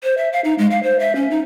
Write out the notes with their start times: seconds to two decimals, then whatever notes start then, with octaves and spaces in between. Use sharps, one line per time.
0.03 C5
0.17 E5
0.33 F5
0.44 D#4
0.59 G#3
0.70 F5
0.83 C5
1.00 E5
1.16 C#4
1.31 D#4